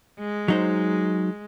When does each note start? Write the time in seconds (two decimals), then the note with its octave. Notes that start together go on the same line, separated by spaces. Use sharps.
0.20 G#3
0.48 F#3 D#4 C5